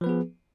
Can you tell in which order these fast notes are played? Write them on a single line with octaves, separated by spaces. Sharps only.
F3 B4 B3 G#4